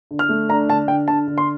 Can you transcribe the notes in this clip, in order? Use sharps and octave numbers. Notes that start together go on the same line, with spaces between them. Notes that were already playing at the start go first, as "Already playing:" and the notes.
D3
F6
A3
D4 A#5
D3 A5
D3 G5
D3 A5
D3
C6